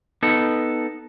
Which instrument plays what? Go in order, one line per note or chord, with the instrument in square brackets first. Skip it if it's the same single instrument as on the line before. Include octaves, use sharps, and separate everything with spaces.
[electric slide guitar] B3 D#4 A4